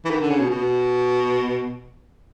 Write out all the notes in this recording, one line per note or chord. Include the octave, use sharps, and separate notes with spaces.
E3
D#3
D3
C#3
B2
B2